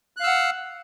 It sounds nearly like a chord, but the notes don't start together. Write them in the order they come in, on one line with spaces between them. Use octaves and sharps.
F#6 F5 E6 F#5